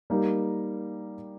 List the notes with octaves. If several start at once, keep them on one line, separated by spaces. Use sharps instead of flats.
G3 A#3 D#4 A#4